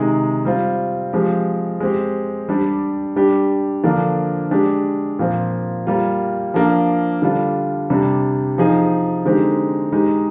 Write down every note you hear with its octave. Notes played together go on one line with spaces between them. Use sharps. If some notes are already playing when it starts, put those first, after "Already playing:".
Already playing: C3 D#3 G#3 D#4 G#4
G3 C4 F4
F3 G#3 C4 G4
G#3 C4 G4
G3 D4 G4
G3 D4 G4
D3 F3 A#3 D4
G#3 D4 G4
A#2 F3 C4
G3 A#3 F4
F3 A#3 D4
D3 G3 D4 F4
C3 G3 D4
F3 C4 D#4 G#4
D3 G#3 C4 D#4 G4
G#3 D#4 G4